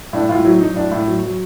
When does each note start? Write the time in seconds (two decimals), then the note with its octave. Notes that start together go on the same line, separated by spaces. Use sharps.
0.13 A2 D4
0.29 A2 F4
0.44 F#3 E4
0.60 F#3 D#4
0.76 A2 D4
0.91 A2
1.07 F#3
1.23 F#3